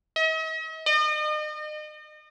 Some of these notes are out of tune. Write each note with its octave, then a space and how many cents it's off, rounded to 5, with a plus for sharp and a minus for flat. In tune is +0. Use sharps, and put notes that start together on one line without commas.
D#5 +45
D#5 -40